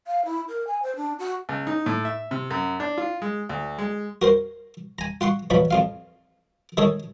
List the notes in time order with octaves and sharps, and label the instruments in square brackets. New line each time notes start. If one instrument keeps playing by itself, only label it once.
[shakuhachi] F5
E4
A#4
G#5
C5
D4
F#4
[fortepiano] C#2
D#4
A2
E5
C3
F#2
D4
F4
G#3
D2
G#3
[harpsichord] F#4 A#4 C5
G#5 A#5
F4 F#5 C6 C#6
E2 B2 F3 F#3 B5
F2 F4 F5
D#3 G#3 G#4 A4 C#5